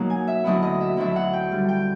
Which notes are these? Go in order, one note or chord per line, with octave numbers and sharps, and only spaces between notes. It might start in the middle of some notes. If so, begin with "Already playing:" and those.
Already playing: B2 F#3 A#3 D#4
G#5
E5
D2 D3 F#3 B3 E4 D#5
D#5
E5
D2 D3 F#3 B3 E4 E5
F#5
G5
G2 D3 G3
G5